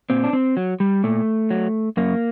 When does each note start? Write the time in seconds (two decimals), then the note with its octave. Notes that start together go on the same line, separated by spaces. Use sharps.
0.10 A#2 C4
0.24 D4
0.33 C4
0.57 F#3
0.80 G3
1.04 A#2 A3
1.51 F#3
1.97 F#2 A#3